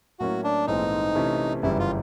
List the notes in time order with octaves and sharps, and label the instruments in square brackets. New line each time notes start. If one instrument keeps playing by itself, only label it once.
[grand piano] A2 F#3 A#3 C#4 E4 [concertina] F#4
[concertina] D4
[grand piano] A#1 G#2 E3 A3 C4 [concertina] D#4
[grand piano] C3 E3 A3 C#4
[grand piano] G1 F#2 C#3 E3 G3 [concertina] E4
[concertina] F4